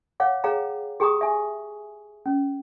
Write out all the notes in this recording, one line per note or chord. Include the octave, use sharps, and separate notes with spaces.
C#5 F5 F#5 D6
G#4 C#5 F5 G5 A#5
G4 G#4 G5 A#5 C#6 D#6
E5 G#5
C#4